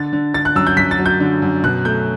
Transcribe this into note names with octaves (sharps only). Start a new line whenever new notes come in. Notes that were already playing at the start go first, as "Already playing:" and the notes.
Already playing: D3 A6
D3
D3 A6
F#6
F#2 E6
G6
F#2 B6
A6
F#3
G6
D3
F#2
B2 F#6
A3 G6